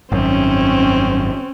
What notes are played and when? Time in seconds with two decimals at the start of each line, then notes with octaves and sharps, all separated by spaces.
0.12 G#1 F#2 C4 C#4